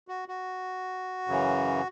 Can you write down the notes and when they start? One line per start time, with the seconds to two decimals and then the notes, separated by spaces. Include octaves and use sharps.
0.08 F#4
0.28 F#4
1.27 F#2 C#3 E3